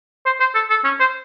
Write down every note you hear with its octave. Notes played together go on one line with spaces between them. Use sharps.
C5
C5
A4
A4
C#4
C5